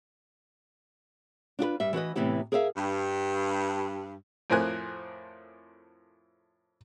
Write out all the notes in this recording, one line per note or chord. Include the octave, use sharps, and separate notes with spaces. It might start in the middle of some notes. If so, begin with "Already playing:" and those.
D4 F4 G4 B4
G2 G3 E5
E3 F#4 B4 D#5
A2 C3 E3 B3 E4 G4
G#4 A#4 C5 E5 F5
G2
F2 A2 C4 A#4 G#5 F#6